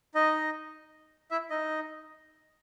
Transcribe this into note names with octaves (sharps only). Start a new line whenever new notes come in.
D#4 D#5
E4 E5
D#4 D#5